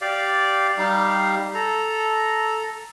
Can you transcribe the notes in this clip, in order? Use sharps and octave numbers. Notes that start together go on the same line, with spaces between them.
G4 D5 F5
G3 D#4 G4 F5
A4 A#5